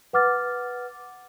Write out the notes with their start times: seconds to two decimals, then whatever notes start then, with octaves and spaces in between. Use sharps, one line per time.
0.13 B4 F#5 D6 F6 A6